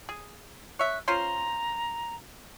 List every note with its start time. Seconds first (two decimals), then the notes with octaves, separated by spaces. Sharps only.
0.09 G#4
0.79 C#5 E5 F#6
1.08 C#4 F4 C5 A#5